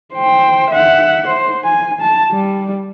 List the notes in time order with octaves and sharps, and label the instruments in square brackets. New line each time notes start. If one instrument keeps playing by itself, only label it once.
[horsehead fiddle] C5 G5
E5 F#5
C5
G#5
A5
G3